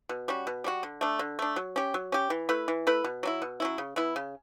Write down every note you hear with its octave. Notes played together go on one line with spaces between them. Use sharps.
B2
G3 C#4 F#4
B2
G3 C#4 F#4
D3
A3 D4
D3
A3 D4
F#3
C#4 G4
F#3
C#4 G4
E3
A3 E4 B4
E3
A3 E4 B4
B2
F#3 C#4 E4
B2
F#3 C#4 E4
C#3
E3 B3 E4
C#3